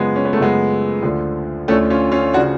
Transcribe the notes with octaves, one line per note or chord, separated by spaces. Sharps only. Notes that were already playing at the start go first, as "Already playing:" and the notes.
Already playing: F#2 C#3 F3 G#3 B3
C#4
B3
A3
F#2 C#3 F3 G#3 B3
D2 D3 F3
D2 D3 F3 A3 C#4
C#4 F4
C#4 F4
C#3 F3 D4 F#4